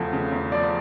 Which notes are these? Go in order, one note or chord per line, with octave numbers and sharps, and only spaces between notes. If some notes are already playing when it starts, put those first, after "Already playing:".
Already playing: E2 C#3 F3 A3
C#3
E2
F3 D5